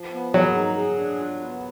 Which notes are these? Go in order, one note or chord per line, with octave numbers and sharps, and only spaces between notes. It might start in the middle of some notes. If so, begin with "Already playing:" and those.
Already playing: F3
B3
F#3 G#4
D#4
G#4
D4
F4
B3